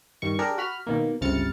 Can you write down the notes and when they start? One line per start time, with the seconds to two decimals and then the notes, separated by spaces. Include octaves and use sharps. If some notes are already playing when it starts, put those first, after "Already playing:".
0.22 G2 D#3 C#6
0.39 D4 G4 G#4 A#4
0.58 F#4 B5 F6
0.87 B2 D#3 A#3
1.21 G1 C#2 C3 F6 A6 C#7